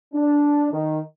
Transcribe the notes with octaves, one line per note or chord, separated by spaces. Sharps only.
D4
D#3